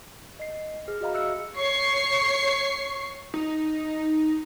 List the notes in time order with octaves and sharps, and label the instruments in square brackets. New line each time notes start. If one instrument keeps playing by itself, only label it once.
[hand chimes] D#5 C7
G#4 F6
F#4 G#4 D#5 F5 A#5 B5
E5 E6 F#6 C#7
[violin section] C#5 C#6 C7
[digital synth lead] D#4